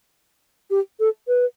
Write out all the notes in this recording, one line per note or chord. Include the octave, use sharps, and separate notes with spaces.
G4
A4
B4